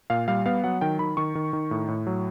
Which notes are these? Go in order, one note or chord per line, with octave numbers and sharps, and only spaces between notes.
A#2 F5
G3 F5
B3 F5
F#3 F#5
D#3 G5
D#3 B5
D#3 C#6
D#3
D#3
A2
A2
F#3